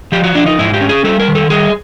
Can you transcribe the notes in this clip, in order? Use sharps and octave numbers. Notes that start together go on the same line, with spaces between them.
F3 G4
F#4
F3 D4
D#4
G#2 E4
G4
C#4
G#4
G3 A4
A#4
D#3
A4
G3 G#4